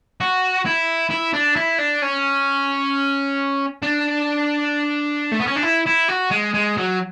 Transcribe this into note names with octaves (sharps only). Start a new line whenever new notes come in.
F#4
E4
E4
D4
E4
D4
C#4
D4
A3
B3
C#4
D4
E4
E4
F#4
G#3
G#3
F#3